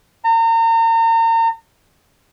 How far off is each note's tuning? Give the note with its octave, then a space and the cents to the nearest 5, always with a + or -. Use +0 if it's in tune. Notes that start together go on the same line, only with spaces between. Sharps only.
A#5 -35